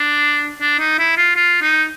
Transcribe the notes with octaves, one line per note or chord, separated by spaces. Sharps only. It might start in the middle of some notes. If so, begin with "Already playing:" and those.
Already playing: D4
D4
D#4
E4
F4
F4
D#4